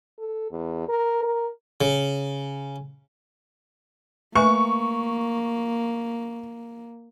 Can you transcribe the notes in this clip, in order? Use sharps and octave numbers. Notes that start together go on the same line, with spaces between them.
A4
E2
A#4
A#4
C#3
A3 A#3 B4 G#5 C#6